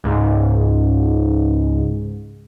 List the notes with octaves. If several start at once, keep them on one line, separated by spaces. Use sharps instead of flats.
C#2 G#2